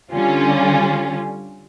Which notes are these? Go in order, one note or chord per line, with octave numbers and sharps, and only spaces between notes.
D3 G3 C#4 F4